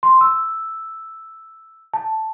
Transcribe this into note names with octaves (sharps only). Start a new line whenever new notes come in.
C6
E6
A5